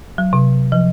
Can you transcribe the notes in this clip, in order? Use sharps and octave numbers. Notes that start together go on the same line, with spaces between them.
F#3
C3
F3